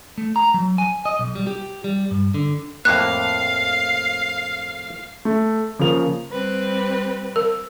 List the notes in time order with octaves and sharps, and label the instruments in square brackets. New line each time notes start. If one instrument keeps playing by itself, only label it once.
[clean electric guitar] A3
A#5
F#3
G#5
D#5
B1
G3
G4
G3
G2
D3
[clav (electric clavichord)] F2 A2 A#3 [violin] F5 [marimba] F#6
[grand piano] A3
C#3 F3 A#3 F7
[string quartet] G3 C4 B4
[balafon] A#4